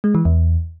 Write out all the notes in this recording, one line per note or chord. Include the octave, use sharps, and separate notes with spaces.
G#3
E3
E2